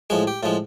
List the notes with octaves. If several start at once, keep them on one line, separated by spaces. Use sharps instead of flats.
A2 F3 G#3 G#4
G4
A2 F3 G#3 F4